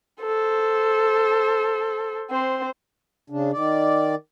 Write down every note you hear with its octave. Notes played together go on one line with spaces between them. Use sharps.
A4 C5
C4 C5
C#3 D4
D#3 D5